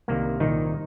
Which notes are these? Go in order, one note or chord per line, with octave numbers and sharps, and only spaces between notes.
C2 C3 D#3 A#3
C2 A#2 D#3 D#4